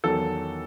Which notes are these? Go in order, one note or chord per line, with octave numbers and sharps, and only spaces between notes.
E2 D#3 F#3 A4